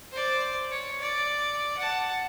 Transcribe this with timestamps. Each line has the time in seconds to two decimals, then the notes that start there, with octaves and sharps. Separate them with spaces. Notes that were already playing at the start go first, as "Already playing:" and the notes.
0.13 C5 D5
0.71 C#5
1.00 D5
1.77 F#5 A5